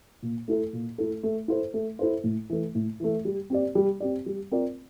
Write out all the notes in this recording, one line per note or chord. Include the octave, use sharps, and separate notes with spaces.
A#2
A3 E4 A4
A#2
A3 E4 A4
A3
E4 A4 C5
A3
E4 A4 C5
A2
E3 A3
A2
E3 A3
G3
C4 G4 D5
G3
C4 G4 D5
G3
C4 F4 A#4 D5